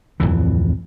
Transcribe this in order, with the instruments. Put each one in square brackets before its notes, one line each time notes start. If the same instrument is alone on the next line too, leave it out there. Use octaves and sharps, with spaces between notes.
[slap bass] D1 G#1 F2 E3